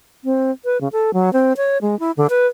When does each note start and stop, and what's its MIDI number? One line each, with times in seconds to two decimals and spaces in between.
0.24 0.51 60
0.65 0.80 71
0.81 0.88 49
0.92 1.13 69
1.14 1.32 54
1.33 1.53 60
1.57 1.78 73
1.82 1.98 56
2.00 2.12 64
2.17 2.27 50
2.30 2.46 71